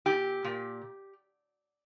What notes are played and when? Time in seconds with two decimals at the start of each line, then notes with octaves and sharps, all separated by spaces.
0.06 A#2 G4
0.44 A#2